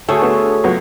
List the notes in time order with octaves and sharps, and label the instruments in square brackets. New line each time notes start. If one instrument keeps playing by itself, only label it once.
[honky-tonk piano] D2 [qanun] A3 [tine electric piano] F#4 G#4 A4 [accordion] C#5
[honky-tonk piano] D3 B3
C#2 F#3 B3